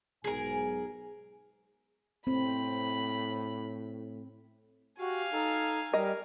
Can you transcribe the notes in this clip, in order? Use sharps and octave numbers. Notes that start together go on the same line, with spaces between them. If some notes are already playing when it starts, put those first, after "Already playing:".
B1 G#2 G#4 A#4 G#5
A2 C4 B5
F#4 G4 F5 G#5
D#4 A4
G3 A#4 D#5